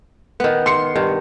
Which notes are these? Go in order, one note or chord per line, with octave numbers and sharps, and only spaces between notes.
D#3 B3
C6 C#7
G2 D#3